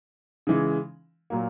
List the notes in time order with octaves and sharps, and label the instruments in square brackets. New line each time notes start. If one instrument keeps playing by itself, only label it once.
[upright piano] C#3 E3 G#3
A#2 F#3 A#3